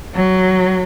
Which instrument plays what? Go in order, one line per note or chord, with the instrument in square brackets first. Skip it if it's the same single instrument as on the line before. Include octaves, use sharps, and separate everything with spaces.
[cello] F#3